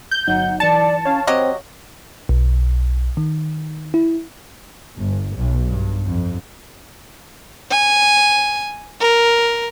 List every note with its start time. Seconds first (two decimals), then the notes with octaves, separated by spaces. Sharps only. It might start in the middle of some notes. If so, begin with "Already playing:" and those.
0.11 G6
0.27 G1 F#3 D#4 F#5
0.60 E3 D5 A5 C#7
1.05 C#4 C#5 F5
1.27 F#3 C4 G4 D#5
2.29 B1
3.17 D#3
3.94 E4
4.97 G1
5.36 B1
5.66 G2
6.06 F2
7.71 G#5
9.00 A#4